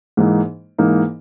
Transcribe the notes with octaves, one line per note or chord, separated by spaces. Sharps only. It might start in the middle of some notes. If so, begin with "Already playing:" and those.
G#2 E3 A#3 D#4
G#2 E3 A#3 D#4